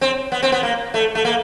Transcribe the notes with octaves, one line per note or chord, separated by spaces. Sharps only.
C4
B3
C4
B3
A#3
A3
A3
A#3